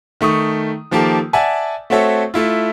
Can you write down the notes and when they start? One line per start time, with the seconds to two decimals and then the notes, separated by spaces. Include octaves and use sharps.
0.21 D#3 A3 C#6 D#6
0.91 D#3 F3 A#3 G4 A4
1.33 D5 E5 F#5 G#5 A5
1.90 A3 C4 F#4 A4 C#5 E5
2.34 A3 E4 F4